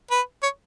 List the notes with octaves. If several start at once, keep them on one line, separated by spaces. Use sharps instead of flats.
B4
C#5